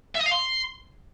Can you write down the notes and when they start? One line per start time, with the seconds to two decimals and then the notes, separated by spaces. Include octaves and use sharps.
0.15 E5
0.21 D#5
0.26 F5
0.32 C6